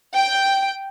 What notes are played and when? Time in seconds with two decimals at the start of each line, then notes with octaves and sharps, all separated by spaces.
0.15 G5